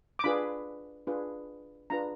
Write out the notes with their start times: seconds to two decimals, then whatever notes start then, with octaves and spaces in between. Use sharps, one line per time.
0.19 D6
0.24 D4 F4 G#4 B4 B5
1.07 D4 F4 G#4 B4
1.90 D4 F4 G#4 B4 A#5